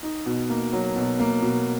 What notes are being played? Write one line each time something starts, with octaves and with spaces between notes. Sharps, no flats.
D#4
B2
A#3
F#3
B2
A#3
B2